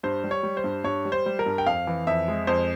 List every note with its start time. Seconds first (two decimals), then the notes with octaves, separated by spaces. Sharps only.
0.03 G2 C5
0.24 G3
0.31 C#5
0.43 G3
0.57 C5
0.64 G2
0.84 G2 C#5
1.05 G3
1.12 C5
1.26 G3
1.39 A#4
1.46 G2
1.58 G5
1.66 F2 F5
1.87 E3
2.07 F2 E5
2.28 G#3
2.47 F2 C5